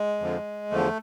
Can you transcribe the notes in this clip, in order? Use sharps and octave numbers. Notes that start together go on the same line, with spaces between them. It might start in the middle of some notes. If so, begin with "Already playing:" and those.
Already playing: G#3
F2 D3 F3
E2 D3 F3 A3